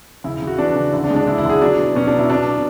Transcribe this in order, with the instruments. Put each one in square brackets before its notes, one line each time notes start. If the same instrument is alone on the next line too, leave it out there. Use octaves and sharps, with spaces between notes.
[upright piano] C#3 E4
E4
C#3
F#4
E3 D4
C#3
D3 E4
D4
G#3
D4
G#3 E4
E4
D3 G#4
F#3 D4
B2
B2 C#4
D4
F#3
E4
B2 D4
B2